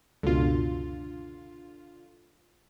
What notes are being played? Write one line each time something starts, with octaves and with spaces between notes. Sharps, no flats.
C#2 F#2 B2 D3 F4